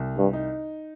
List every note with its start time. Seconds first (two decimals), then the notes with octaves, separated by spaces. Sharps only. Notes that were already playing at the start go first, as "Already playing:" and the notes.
Already playing: C2
0.18 G2
0.33 D#4